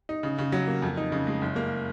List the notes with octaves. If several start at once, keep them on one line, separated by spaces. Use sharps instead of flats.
D#4
C#3
C#3
F#3
A#3
F2
D#4
C#3
G#3
F#1
A#3